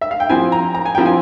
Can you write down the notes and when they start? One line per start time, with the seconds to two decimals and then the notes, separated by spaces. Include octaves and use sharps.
0.01 E5
0.11 F5
0.20 G5
0.29 F3 C4 E4 G#5
0.52 A#5
0.75 A#5
0.86 G#5
0.95 F3 C4 E4 G5
1.06 G#5